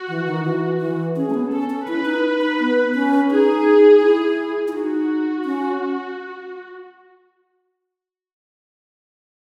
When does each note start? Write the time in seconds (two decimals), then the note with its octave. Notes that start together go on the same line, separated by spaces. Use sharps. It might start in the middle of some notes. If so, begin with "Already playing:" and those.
Already playing: F#4
0.08 E3
0.27 D#3
0.45 E3
0.80 E3
1.16 C#4 G#4
1.30 A3
1.34 B3
1.52 C#4 A4
1.70 C#4
1.88 E4 B4
2.05 D#4
2.41 D#4
2.60 B3
2.94 C#4
3.31 D#4 G#4
4.02 E4
4.68 E4
4.74 D#4 F#4
5.45 C#4